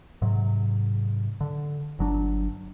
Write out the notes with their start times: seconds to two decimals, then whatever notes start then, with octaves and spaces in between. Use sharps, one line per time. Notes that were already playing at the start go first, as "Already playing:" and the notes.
0.22 G#2 C3 F#3
1.41 D3
1.99 G1 F#3 D4